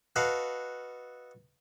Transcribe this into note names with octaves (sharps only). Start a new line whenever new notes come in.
F#4 A4 B4 D#5 F5